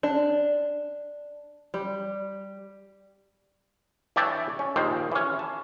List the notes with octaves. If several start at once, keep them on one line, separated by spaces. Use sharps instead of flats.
D4
G3
E3 D4 C#5 E5 G5 A5
C#4
A#1 D#2 D#3 C5
E3 C#4
A5